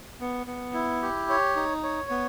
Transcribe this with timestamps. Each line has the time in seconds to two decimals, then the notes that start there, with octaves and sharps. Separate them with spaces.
0.20 B3
0.47 B3
0.74 E4
1.02 G4
1.29 C#5
1.56 D#4
1.83 C#5
2.10 B3